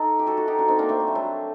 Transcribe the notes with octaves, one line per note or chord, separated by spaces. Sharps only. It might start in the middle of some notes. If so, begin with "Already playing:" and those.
Already playing: D#4 A4
G4
F#4 A4
F#4 A4
D#4 G4
D4 F#4
C4 D#4
A#3 D4
A3 C4
A3
G3
F#3 A3